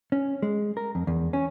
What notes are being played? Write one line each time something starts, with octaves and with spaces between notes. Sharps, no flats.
C#4
G#3
A#4
F2
E2
C#4